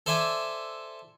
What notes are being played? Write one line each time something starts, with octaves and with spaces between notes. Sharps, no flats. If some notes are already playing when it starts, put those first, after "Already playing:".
A4 C5 D5 E5 G#5